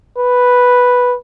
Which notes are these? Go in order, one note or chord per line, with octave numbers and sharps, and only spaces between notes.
B4